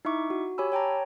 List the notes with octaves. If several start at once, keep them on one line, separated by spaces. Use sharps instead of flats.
D#4 E4 E5 C#6 D6
F#4
G4 C#5 G#5 B5 E6
C#5 G5 A5 A#5